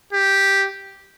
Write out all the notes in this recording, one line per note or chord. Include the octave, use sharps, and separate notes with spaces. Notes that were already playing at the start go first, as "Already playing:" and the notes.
G4